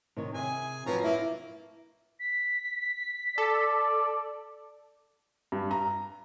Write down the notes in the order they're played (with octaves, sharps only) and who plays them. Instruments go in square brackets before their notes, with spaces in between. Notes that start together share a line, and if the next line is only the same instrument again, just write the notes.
[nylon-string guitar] C3 D#3 C#5
[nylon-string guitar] C3 [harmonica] G#4 G#5
[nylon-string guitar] F2 F#3 B4 [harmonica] F3 C#5 A#5
[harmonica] A#3 [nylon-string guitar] E4 E5
[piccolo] B6
[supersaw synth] A4 [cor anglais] D5
[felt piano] G2
A#5